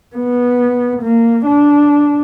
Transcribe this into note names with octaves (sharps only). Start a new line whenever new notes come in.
B3
A#3
D4